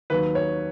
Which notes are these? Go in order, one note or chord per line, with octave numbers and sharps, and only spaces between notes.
D#2 D#3 F#3 B4
C#5